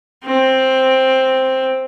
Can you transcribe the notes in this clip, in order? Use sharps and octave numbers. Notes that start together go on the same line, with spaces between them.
C4